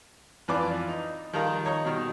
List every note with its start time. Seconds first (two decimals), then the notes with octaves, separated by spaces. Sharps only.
0.48 F2 E3 F4 B4 D5 D6
0.89 D#4
1.33 D#3 F3 G3 F4 A#4
1.65 D#4 C#5 A#5 C#6
1.85 B2 D#3 G3